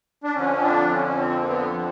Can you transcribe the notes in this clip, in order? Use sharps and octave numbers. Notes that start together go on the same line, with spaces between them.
D4
F2 D3 F3 C#4
D4
C#4
C4
A#3
B3
F3